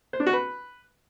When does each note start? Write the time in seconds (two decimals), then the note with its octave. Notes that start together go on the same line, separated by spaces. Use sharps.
0.13 C5
0.20 D4
0.26 F#4
0.33 B4